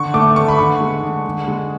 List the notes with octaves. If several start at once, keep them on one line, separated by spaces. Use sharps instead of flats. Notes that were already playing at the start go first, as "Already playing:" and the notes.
Already playing: D3 C#6
A3 D6
D3 C#6
B5
D3 C#6
G#3
D3
D3
G#3